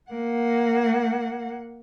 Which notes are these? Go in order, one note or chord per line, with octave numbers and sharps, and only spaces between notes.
A#3 F#5